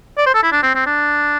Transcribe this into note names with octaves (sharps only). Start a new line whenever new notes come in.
D5
C5
A4
E4
D4
C4
C4
D4